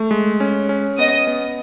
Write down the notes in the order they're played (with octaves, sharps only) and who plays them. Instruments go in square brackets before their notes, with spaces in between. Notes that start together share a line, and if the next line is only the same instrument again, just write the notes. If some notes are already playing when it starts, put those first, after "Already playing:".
Already playing: [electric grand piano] A3
G#3
C#4
C#4
[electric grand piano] B3 [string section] D#5 D#6
[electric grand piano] B3